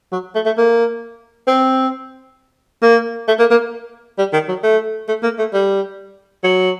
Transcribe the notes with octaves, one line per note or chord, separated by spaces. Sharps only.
F#3
A3
A3
A#3
C4
A#3
A3
A#3
A#3
G3
D#3
F#3
A3
A3
A#3
A3
G3
F#3